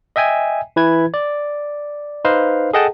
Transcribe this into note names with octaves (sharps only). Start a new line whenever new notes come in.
D#5 E5 G5 G#5
E3 E4 B4 G#6
D5
D#4 B4 C5 D#5 F5
G#4 A4 D#5 F#5 G5 A5